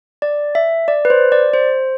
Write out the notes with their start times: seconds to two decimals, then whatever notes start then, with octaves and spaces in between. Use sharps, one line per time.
0.22 D5
0.55 E5
0.88 D5
1.05 B4
1.10 C5
1.32 D5
1.54 C5